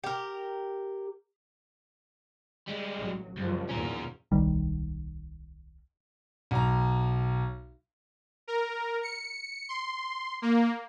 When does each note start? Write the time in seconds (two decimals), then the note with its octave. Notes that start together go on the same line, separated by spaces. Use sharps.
0.04 G4 A#4
2.67 G3 G#3
2.97 A1 F#3
3.37 C#2 F#2 F3 G3
3.69 E2 A#2 D#3 C#4 A#4
4.32 D1 B1 D#3 G3
6.51 B1 A#5
8.48 A#4
9.03 C#7
9.69 C6
10.42 A#3